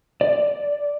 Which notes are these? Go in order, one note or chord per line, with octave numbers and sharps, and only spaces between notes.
D5